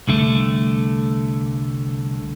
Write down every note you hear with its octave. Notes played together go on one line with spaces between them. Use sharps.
C2 D3 A3